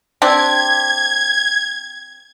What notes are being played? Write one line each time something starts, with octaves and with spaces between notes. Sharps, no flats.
C4 D4 G4 G#6